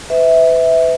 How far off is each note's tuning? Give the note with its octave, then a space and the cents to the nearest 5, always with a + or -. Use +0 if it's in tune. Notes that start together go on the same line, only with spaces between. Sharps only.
B4 +35 E5 -20